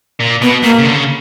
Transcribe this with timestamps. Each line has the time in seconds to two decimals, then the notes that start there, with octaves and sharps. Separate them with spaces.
0.20 A#2
0.42 B2 B3
0.63 B2 A#3
0.79 C#3
0.85 D3
0.96 C#3